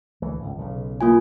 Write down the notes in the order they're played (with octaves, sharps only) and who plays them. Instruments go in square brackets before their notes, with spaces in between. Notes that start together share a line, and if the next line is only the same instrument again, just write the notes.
[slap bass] D2 E3 A3
G#1 C#2
B1 C#3
[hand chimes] A#3 F4 G#5